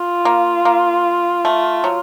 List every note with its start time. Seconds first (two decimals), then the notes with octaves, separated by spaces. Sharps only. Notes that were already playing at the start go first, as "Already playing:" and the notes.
Already playing: F4
0.25 A#3
0.65 A#3
1.45 A3
1.84 F#3